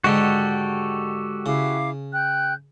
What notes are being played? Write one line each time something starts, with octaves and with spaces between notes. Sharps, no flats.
G#2 D3 D#3 F#4 G4 A4
C#3 E4 F5 D6
G5 F#6 G6